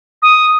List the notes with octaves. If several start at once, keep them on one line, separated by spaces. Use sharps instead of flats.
D#6